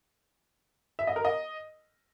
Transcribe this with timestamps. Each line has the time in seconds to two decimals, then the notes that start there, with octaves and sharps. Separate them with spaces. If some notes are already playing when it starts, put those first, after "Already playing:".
0.99 E5
1.07 D#5
1.16 A#4
1.25 D#5